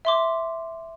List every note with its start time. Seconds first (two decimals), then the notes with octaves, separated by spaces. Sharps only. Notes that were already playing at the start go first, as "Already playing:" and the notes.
0.05 E5 C6 D6